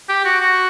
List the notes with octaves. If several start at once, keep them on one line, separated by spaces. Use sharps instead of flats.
G4
F#4
F#4